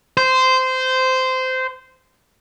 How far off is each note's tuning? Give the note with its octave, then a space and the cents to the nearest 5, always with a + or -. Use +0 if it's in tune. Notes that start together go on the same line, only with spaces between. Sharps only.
C5 -15